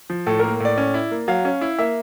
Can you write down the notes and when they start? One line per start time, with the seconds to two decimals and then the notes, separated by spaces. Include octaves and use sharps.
0.10 F3
0.27 A2 A4
0.39 A#3 A#4
0.60 A2 D5
0.78 C#4
0.94 E4
1.11 A#3
1.28 F#3 F5
1.45 C#4
1.61 E4
1.78 A#3 E5